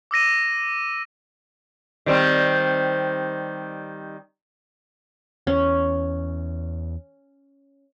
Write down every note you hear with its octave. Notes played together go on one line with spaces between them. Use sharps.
D6 E6 A#6 D#7
D#3 G3 C4
E2 C#4